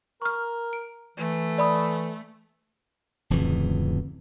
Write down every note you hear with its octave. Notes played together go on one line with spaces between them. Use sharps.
A#4 C#6 F6
D7
E3 A3
D5 B5 D#6
D1 F2 C#3 E3